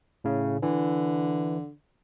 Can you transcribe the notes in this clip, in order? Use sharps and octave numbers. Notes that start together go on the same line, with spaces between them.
A2 C#3
D3 E3